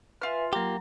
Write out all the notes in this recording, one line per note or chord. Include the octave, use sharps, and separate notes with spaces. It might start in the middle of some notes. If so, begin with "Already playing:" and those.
F4 B4 E5 G#5 F6
F#3 A#3 G4 A#5